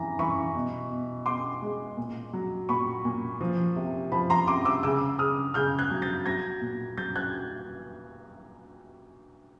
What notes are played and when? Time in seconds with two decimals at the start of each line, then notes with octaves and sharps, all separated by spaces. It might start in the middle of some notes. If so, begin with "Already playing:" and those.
Already playing: C3 E3 A#5
0.19 E3 B5 C#6
0.55 B2
0.90 B2
1.26 B2 C6 D6
1.62 G#3
1.97 A#2
2.33 F#3
2.69 A#2 B5 C#6
3.05 A#2
3.41 F3
3.76 C3
4.12 F3 A5 B5
4.30 A#5 C6
4.47 C3 C6 D6
4.65 D6 E6
4.83 C#3 D6 E6
5.18 C#3 D#6 F6
5.54 C#3 F6 G6
5.79 F#6 G#6
5.91 F#3
6.02 G6 A6
6.26 F#3 G#6 A#6
6.61 A#2
6.97 F#3 G6 A6
7.16 F#6 G#6